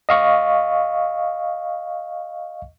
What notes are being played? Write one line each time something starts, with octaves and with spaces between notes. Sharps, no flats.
D#5 F5 C#6